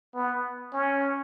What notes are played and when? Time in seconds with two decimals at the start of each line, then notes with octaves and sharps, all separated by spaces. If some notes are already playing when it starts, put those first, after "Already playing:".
0.15 B3
0.73 C#4